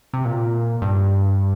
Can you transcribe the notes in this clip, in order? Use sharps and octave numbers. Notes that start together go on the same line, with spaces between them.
C3
A#2
G2